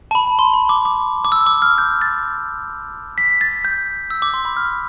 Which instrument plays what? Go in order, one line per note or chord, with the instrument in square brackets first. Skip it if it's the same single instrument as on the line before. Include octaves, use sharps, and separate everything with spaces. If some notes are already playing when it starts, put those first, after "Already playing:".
[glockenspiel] A5
B5
C6
B5
D6
D6
D6
E6
D6
F6
G6
A6
B6
A6
G6
E6
D6
C6
B5
F6